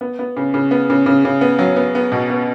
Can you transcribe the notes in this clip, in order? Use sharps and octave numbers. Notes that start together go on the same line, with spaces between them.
B3
B3
C#3
C#3
B3
C#3
C#3
C#3
B3
F#3
B3
B3
B2
B3